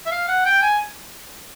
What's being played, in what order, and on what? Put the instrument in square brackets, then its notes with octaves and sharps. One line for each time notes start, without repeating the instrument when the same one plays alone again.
[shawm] E5
F5
F#5
G5
G#5